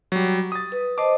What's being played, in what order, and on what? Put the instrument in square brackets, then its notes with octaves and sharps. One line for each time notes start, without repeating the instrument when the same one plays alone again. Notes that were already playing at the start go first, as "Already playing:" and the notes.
[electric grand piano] F#3 G3
D#6 A6
[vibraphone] B4
[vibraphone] C5 D#5 A5 [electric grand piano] D6